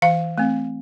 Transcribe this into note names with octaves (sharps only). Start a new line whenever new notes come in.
E3 F5
A3 C4